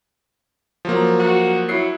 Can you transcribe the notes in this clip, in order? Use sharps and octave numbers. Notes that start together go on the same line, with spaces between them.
F3 F#3 A#3
F#4
F#3 E4 C7